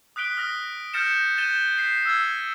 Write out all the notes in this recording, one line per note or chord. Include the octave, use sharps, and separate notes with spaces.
D#6 F#6 B6 D7 G7
D#6 F6 A#6
F6 G6 A6 A#6 C#7 E7
G6 A6 D#7 E7 G7
G6 B6 C7
E6 F6 G#6